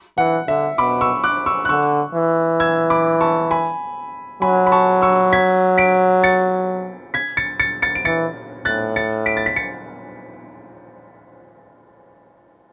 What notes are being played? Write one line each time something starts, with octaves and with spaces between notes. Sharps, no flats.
E3 F#5
D3 E5
B2 B5 D6
C#6 E6
D6 F#6
C#6 E6
F#6
D3 C#6 E6
E3
E6 G#6
B5 D6
A5 C#6
G#5 B5
F#3 G#5 B5
B5
A5 C#6
C#6 E6
G#6 B6
B6 D7
A6 C#7
G#6 B6
A6 C#7
A6 C#7
A6 C#7
D7
E3 A6 C#7
A2 F#6 A6
A6 C#7
B6 D7
A6
B6
A6 C#7